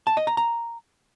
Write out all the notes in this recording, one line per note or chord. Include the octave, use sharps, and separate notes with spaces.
A5
D#5
A#5
A#5